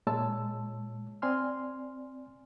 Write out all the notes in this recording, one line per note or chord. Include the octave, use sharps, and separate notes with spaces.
A#2 G#3 C#5 A5 E6
C4 D5 G#5 C6 F6